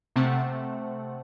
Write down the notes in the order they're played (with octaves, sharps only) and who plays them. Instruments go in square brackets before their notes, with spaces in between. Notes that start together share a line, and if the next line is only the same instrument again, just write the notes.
[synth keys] C3 A3 C4 F#5